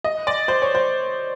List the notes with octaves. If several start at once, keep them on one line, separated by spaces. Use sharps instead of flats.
D#5
D5
C5
C#5
C5